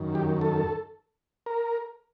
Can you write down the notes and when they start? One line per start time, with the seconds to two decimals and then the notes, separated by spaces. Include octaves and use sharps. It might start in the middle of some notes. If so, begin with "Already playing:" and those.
Already playing: F#2 D#3
0.15 G4
0.41 A4
1.46 A#4